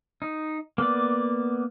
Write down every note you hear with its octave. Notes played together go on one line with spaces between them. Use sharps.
D#4
A#3 B3 D5